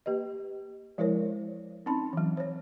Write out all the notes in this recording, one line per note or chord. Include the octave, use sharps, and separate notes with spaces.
A#3 G4 B4 D#5
F3 G#3 E4 A#4 C5 C#5
C4 C#4 D#4 A5 B5
E3 F#3
C5 C#5